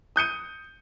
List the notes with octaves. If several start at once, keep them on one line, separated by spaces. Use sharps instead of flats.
D#6 G6 C#7 D#7